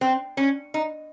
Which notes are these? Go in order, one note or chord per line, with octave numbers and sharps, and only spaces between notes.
C4
C#4
D#4